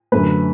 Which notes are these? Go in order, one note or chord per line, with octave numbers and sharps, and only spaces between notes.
F#2 D3 A3 B4